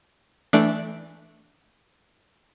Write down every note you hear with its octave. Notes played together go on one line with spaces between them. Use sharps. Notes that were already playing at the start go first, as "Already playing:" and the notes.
E3 A3 D4